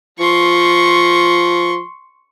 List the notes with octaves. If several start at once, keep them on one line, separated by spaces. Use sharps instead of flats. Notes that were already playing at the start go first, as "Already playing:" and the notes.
F3 C6 C#6